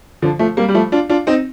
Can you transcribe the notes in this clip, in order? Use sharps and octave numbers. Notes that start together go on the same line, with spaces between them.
D3 F3
F3 A3
G3 A#3
G3
F3 A3
D4 F4
D4 F4
C4 D#4